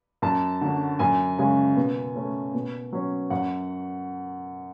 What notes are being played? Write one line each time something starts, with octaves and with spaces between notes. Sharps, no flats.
F#2 A5
D3 F#3
F#2 G#5
C#3 G#3 C#4 G#5
B2
A3 C#4
B2
F#3 C#4
F#2 F#5